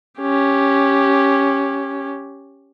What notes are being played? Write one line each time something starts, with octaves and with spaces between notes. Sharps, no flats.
C#4 G4